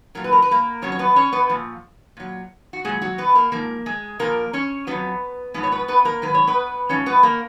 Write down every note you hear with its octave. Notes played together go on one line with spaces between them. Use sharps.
A#2 F#3 A#4
B4
A#4
B4
A#3 A#4
F2 C#3 F#3 C#4 C#5
C#5
B3 B4
C#4 C#5
B3 B4
A#2 F3
A#2 F#3
F#4
A#2 F#3 G#3 G#4
F#3 F#4
B3 B4
A#3 A#4
G#2 F3 A#3 A#4
G#3 G#4
A#2 F3 A#3 A#4
C#4 C#5
F2 D#3 F#3 B3 B4
G#2 F3 B3 B4
C#5
B3 B4
B3 B4
A#3 A#4
G#2 D#3 F#3 B4
C#5
B3 B4
G#2 F3 C#4 C#5
B3 B4
A#3 A#4